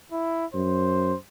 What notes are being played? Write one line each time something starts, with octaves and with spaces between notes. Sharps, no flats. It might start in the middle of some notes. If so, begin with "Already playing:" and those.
E4
F#2 C5